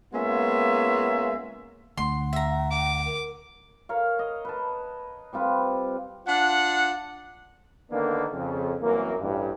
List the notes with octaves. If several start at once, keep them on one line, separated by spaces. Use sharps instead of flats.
G#3 A#3 B3 C#4 F4 E5
D2 F#5 C6
E5 A#5
D6
A#4
A#4 C#5 F5
D#5
B4 A5
G3 C4 F4 B4
D4 F4 F#5
D3 D#3 A#3 B3 D4 B4
F2 C#3
C2 F#2 E3 A#3
A1 G2